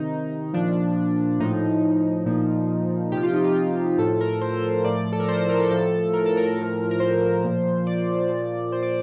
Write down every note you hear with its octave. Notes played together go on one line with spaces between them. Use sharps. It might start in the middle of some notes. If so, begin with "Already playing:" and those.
Already playing: C3 D#3 D#4
A#2 F3 D4
A2 F3 D#4
A#2 F3
C3 F3 G4
F4
D#4
F4
A2 F3 A4
A#4
C5
A2 F3 D5
A4
A#4
C5
C5
A#4
A4
A2 F3 A4
A#4
A4
A#4
A2 F3
A#4
C5
A#2 F3
D5
A#2 F3
C5
D5